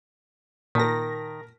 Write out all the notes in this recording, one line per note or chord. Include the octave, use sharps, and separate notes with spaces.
A#2 D#3 A#4 A5 A#6 B6